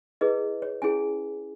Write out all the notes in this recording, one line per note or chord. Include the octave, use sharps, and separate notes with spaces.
E4 G#4 B4 D#5
C#5
C#4 E4 G#4 G#5